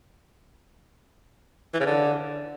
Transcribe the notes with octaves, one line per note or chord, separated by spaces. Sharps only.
E3
C#3
D3